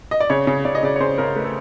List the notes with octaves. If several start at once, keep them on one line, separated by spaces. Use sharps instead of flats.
D#5
D5
C#3 C#5
C#3
C#3 D5
D#5
C#3 D5
C#5
C#3 C5
C#3 A#4
A3 B4
A4